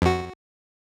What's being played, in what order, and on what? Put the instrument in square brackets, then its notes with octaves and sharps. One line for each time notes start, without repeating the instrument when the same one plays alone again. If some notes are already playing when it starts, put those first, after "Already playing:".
[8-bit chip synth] F2 F#4